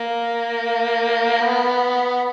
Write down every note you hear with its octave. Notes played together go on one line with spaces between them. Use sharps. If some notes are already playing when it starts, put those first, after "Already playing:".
Already playing: A#3
B3